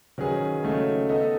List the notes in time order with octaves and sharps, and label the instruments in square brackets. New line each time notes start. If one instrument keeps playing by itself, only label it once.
[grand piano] D#3 F#3 C#4 G#4 B4
C#3 F#3 A3 D#4
B3 D#4 A4 D#5